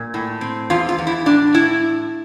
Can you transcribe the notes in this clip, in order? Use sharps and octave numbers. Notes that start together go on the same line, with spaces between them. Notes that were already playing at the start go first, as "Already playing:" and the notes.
Already playing: A#2
A2
C4
E2 F4
F4
E2
E4
A2 D4
A2 E4